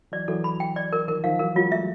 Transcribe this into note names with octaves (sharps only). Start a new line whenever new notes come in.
E3 F#3 D5
E3 F#3 A4
B5
G5
D5
A#4
D#3 F3 A#4
D#3 F3 F5
E3 F#3 A#4
F#3 G#3 F4
G3 A3 E5